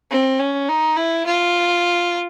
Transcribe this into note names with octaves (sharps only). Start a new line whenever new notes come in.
C4
C#4
D#4
E4
F4